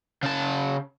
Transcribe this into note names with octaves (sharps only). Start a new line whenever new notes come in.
C#3 A5